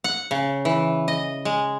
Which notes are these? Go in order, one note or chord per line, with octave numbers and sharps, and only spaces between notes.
F#5
C#3
E3
D#5
G#3